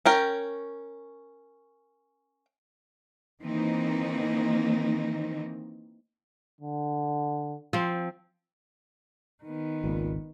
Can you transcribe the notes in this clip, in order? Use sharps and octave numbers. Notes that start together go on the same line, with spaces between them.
C#4 A#4 G5
D#3 E3 A#3 C4 D#4
D3
F3 C4
D#3 B3
G#1 C#2 A#2